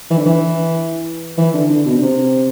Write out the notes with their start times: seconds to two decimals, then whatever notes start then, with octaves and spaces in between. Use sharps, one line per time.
0.10 E3
0.18 D3
0.26 E3
1.38 E3
1.53 D3
1.70 D3
1.86 B2
1.96 D3
2.02 C3